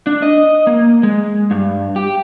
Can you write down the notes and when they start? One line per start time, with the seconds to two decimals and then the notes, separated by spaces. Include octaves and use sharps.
0.07 D4
0.22 D#5
0.67 A#3
1.03 G#3
1.51 G2
1.96 G4